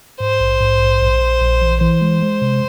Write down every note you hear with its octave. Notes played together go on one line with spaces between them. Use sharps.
G#2 C5
A#1
G#2
A#1
A#1
A#1
A#1
E3
E3 C5
G#3
G#3
C3